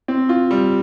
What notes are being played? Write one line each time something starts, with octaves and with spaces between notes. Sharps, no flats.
C4
F4
G3